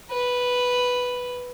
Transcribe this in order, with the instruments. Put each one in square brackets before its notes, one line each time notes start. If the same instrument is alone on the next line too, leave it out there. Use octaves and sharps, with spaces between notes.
[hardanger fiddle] B4